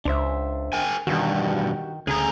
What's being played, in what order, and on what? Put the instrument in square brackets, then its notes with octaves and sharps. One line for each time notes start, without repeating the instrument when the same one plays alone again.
[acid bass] C#2 [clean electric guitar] D4 C5 E5
[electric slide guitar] A#4 G5 G#5
[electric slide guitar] E2 G2 B2 [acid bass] D#3 [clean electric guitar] F#4 G4
[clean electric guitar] D2 [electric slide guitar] C#3 A3 A#5 [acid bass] G#4